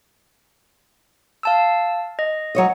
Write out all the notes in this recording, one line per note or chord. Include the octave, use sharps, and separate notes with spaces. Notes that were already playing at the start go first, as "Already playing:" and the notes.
F5 A5 E6
D#5
F#3 C#5 D#5